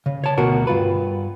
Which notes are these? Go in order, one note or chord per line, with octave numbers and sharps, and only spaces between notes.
C#3
C#5 A5
D2 B2 F#4 A#4
G2 F4 B4